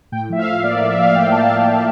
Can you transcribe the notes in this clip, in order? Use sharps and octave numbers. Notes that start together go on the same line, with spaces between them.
A2 G5
F3 E5
F5
A2
A#3 D5
D5
A2
E5
F3 F5
A2 G5
A#3 A5
A2 G5
F3 F5